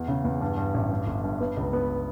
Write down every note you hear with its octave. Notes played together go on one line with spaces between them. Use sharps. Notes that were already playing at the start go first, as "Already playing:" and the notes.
Already playing: E2
C#3
E2
G2
G2
A1
G2
G1
G2
B3
C#2
B3